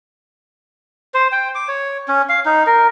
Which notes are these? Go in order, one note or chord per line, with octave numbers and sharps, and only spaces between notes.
C5
G5
D6
C#5
C#4
F5
D#4
A#4